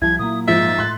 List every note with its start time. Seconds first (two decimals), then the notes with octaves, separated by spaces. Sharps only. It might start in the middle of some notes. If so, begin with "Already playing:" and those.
0.02 C2 F3 G3 E4 G#6
0.19 A#2 F#3 A#3 D#6
0.48 G#2 F3 E5 A6
0.79 A2 C6 F#6